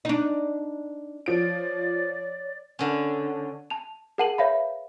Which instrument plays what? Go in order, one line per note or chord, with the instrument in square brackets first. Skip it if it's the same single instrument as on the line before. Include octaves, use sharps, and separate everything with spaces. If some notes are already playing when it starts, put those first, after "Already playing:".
[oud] D4 D#4
[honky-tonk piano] F3 D7 [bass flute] C#5 [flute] D5
[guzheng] D3 C#4
[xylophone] A5 F7
G#4 A#4 F#5 A5 D#7 F#7
B4 C#5 E5 F5 B5